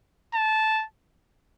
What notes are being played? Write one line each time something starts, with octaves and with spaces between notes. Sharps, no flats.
A5